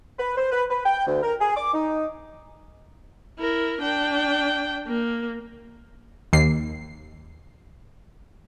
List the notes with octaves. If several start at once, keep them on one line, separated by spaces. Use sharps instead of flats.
B4
C5
B4
B4
G5
D2
A#4
G#4
D6
D#4
E4 A#4
D4 G5
A#3
D#2 C7